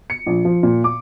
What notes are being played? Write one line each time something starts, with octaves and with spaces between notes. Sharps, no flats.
C#7
A#1
F3
A#2
D6